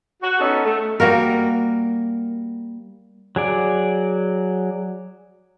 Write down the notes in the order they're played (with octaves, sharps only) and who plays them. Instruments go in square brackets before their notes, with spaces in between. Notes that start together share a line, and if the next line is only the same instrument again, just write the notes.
[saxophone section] F#4
B3 C#4 D#4 A4
A3
[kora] G3 A#3 F#4 A#4
[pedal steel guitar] F#3 G#4 D5